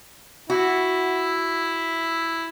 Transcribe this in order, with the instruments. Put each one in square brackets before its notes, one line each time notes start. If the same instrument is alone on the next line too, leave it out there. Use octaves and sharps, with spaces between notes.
[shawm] E4 [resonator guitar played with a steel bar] F#4